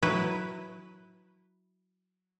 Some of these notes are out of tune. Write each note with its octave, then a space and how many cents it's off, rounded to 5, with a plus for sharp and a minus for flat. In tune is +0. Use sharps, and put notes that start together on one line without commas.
F#3 -5 E4 -15 B4 +0